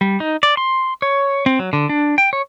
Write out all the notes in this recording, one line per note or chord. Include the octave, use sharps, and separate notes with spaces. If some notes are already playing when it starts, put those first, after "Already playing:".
G3
D#4
D5
C6
C#5
C4
F#3
D3
D4
G5
C#5